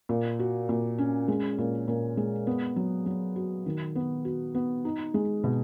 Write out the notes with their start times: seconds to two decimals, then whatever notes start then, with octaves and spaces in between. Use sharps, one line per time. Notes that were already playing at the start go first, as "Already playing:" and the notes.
0.09 A#2
0.39 F#4
0.69 A#2
0.98 C#4
1.28 G#3
1.58 A#2
1.88 A#2
2.17 G#3
2.47 B3
2.76 F#3
3.06 F#3
3.36 F#4
3.66 D#3
3.95 B3
4.25 F#4
4.55 B3
4.85 D#4
5.14 G#3
5.44 B2